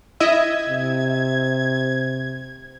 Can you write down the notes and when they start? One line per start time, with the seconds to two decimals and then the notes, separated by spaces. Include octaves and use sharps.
0.20 E4 D#5 E5 G#6
0.69 C3